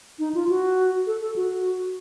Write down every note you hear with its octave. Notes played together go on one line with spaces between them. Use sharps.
D#4
F4
F#4
A4
A4
F#4